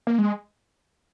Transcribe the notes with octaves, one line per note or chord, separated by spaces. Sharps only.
A#3
G#3